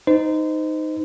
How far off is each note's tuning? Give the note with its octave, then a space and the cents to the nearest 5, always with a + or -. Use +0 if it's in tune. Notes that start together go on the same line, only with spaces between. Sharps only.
D#4 +0 C5 -30